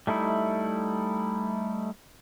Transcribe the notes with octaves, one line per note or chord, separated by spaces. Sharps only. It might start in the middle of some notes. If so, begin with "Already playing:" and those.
G3 A3 D#4 E4